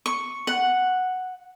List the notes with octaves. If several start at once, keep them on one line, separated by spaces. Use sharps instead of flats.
C#6
F#5